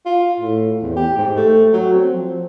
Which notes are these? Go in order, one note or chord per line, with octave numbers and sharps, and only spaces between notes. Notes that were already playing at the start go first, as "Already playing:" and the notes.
F4
A2
E2
G4
G#2
A3
F#3
C4
F3